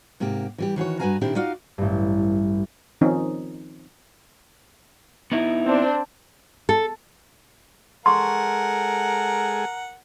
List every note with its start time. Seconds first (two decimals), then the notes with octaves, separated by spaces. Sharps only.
0.20 G#2 C3 A#3 G4
0.58 E3 G3 G4
0.76 D#3 E3 F#4 C#5
0.99 G2 F#4 B4 F5 G#5 A#5
1.21 A#2 D#3 C4 D4 E4 G4
1.35 D#4 F4 F#4 D5 F5
1.78 A1 G2
3.01 D#3 F3 C4 C#4 D#4
5.32 B3 D#4 E4
5.65 C4 D4
6.69 A4
8.06 G#3 A4 A#4 F#5 G#5 C6 C#6